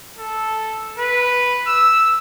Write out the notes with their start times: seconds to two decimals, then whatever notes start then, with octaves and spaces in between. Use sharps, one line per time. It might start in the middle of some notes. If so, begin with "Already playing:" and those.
0.18 A4
0.99 B4
1.67 E6